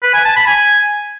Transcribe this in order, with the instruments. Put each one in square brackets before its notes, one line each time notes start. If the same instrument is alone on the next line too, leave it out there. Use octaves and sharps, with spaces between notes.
[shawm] B4
G#5
A5
B5
G#5